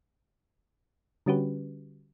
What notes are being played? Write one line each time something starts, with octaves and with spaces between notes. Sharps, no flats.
D3 G3 C#4 F#4 G4 B4